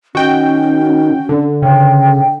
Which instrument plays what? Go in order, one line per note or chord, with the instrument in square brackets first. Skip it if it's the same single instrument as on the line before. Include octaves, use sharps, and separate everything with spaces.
[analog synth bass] D#3 [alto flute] C#4 [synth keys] F#4 G5
[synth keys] D3
[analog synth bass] C#3 [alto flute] G5